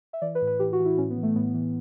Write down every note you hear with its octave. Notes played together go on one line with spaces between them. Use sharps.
E5
E3 D5
B4
A2
B4
E3 G4
F#4
E3
E4
A2 C#4
B3
E3
A3
A2 B3
E3